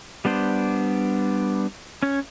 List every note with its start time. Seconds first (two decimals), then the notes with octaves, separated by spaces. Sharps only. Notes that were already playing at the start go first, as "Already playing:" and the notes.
0.25 G3 B3 D4 C5
2.03 C#4 C#5